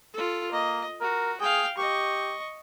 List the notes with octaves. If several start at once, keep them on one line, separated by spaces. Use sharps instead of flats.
F4 A4
A#3 D#5
F#4 A#4
G#4 F5 G5
G4 D#5 C#6